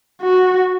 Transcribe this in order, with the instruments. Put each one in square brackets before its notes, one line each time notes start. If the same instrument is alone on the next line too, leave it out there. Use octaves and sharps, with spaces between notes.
[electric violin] F#4